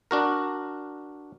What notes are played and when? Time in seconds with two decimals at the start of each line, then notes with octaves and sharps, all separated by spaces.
0.11 D4 F#4 A#4